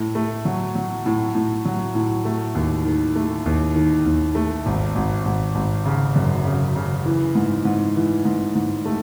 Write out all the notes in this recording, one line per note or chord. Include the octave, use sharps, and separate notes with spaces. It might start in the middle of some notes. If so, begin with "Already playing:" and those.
Already playing: A2
A3
F#3
F#3
A2
A2
F#3
A2
A3
D#2
D#3
A3
D#2
D#3
D#2
A3
G#1
G#1
G#1
G#1
C#3
F#2
C#3
C#3
E3
G#2
G#2
E3
G#2
G#2
A3